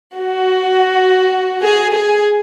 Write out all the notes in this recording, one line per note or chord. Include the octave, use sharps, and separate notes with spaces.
F#4
G#4
G#4